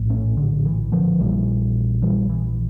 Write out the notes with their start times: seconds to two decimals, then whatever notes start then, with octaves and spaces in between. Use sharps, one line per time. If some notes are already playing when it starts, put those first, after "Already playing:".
Already playing: A#1 A2
0.09 A3 C#4
0.37 D3
0.65 E3
0.92 D3 F3
1.19 A#1 A#2 E3 G3
2.02 E3 G3
2.29 E3